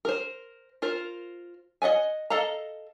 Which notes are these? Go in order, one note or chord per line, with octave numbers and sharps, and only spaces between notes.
A#4 C5
F4 A#4 C5
D#5 E5 F#5 G#5
A4 D#5 F5 A#5